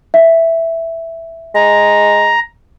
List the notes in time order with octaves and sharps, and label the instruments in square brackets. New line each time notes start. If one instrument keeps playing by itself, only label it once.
[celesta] E5
[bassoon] G#3 [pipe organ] A#5